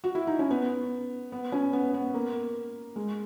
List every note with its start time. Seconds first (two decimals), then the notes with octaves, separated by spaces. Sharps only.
0.04 F#4
0.15 E4
0.27 D#4
0.39 C#4
0.51 B3
1.32 B3
1.52 C#4
1.73 B3
1.94 B3
2.14 A#3
2.96 G#3